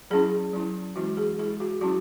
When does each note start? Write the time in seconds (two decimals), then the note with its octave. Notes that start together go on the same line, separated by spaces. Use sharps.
0.10 F#3 C#4 E4 G#4
0.53 F#3 C#4 E4
0.96 E3 G#3 C#4 E4 F#4
1.17 G#4
1.38 G#3 E4 G#4
1.60 F#4
1.81 F#3 C#4 E4 F#4